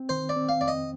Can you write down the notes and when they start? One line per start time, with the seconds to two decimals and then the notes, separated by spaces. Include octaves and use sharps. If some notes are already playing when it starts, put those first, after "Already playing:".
Already playing: C4
0.09 D#3 C5
0.29 D5
0.36 C4
0.49 F5
0.61 F2 D5
0.68 D#5